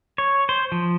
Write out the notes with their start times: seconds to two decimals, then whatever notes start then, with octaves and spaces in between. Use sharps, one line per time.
0.18 C#5
0.49 C5
0.72 F3